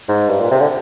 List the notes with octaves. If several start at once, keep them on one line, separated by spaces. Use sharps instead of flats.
G#2
G2
A#2
C3
D3